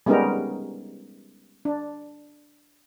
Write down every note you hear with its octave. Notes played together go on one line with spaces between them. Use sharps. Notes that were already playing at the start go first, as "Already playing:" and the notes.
G3 G#3 B3 C#4 D#4 A#4
D4